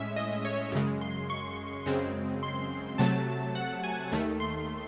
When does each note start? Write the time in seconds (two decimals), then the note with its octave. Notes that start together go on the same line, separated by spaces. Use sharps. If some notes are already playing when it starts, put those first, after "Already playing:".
Already playing: A2 G#3 C#4 E5
0.16 D#5
0.45 C#5
0.72 F#2 C#3 G#3
1.01 C6
1.30 C#6
1.86 F#2 C#3 G#3 C4
2.43 C6
2.98 C3 F#3 A3 A5
3.55 F#5
3.84 G#5
4.12 D#2 D#3 A3
4.40 C6